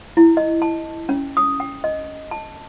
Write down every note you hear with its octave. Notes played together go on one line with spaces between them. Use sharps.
E4
D#5
A5
C#4
D#6
G5
D#5
A5